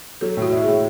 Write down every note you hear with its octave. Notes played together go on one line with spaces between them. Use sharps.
F#3 A4
A2 F#4
E4
G#4
A2